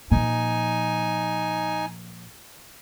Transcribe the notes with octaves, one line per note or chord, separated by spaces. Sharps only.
A#2 F3 D#4 G#5